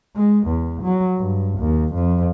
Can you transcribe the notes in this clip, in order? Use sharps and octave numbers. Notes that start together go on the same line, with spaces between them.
G#3
E2
F#3
G2
D#2
F2